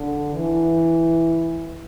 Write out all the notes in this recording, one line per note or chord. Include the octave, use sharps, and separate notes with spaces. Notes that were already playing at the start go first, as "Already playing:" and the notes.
Already playing: D3
E3